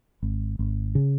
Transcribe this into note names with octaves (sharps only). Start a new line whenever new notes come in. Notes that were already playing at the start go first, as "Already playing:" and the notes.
G#1
G#1
C#3